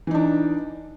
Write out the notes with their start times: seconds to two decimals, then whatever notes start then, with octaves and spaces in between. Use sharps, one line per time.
0.07 E3
0.11 D#4
0.14 D4